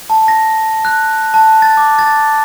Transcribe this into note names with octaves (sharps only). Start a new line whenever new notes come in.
A5
A#6
F#6
A5
A6
D6
A6